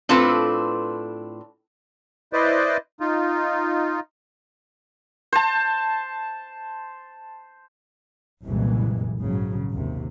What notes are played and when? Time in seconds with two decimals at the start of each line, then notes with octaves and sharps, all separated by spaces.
0.09 A2 C4 D4 F4 A4 B4
2.33 E4 B4 C5 D5 D#5
3.00 D#4 F4
5.32 C5 A5
8.44 F#1 C2 F2 A#2 E3 G#3
9.19 A#1 G#2 C#3 F#3
9.70 G#1 D#2 C3